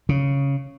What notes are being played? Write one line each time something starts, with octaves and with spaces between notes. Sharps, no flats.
C#3